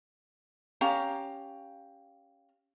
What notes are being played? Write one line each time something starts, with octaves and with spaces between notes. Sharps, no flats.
C#4 G4 F5 A#5